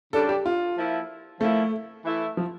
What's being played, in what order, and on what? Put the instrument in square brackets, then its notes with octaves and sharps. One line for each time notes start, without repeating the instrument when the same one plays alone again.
[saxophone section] C#3 G3 D4 [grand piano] A4
[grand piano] G4
F4
[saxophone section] F3 A#3 E4
[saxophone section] F3 A#3 E4 [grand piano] A3
[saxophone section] E3 A3 E4
[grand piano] F3